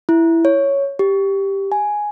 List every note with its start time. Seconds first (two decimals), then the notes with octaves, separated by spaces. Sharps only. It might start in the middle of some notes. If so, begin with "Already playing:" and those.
0.09 E4
0.45 C#5
0.99 G4
1.72 G#5